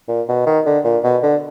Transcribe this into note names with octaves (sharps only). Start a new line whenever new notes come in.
A#2
B2
D#3
D3
A#2
B2
D3